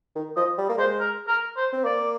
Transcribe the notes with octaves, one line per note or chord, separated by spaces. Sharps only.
D#3
F3 D#5
G3
A#3
G#3 C5
A#4
A#4
C5
C4
A#3 D5